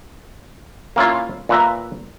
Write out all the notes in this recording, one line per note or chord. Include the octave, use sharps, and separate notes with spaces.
A#3 C#4 E4 F4
A#2 B4 E5 A#5